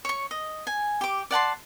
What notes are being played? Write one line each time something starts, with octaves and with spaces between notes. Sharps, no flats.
C#5 C#6
D#5
G#5
G4 D6
D5 F#5 A5 C6